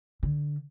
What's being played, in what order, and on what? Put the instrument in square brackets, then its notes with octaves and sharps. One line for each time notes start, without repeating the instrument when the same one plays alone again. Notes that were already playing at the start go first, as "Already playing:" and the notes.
[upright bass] D3